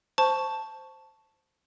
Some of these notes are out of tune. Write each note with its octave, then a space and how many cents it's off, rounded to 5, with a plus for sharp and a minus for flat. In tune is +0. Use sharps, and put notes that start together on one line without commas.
C5 +0 A5 +0 C#6 +5